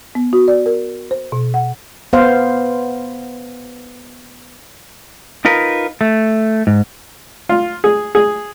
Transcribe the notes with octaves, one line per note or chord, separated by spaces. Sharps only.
B3
F#4
D5
A#4
C5
B2
F#5
B3 C5 F5
D#4 F4 A#4 B4
A3
G#2
F4
G#4
G#4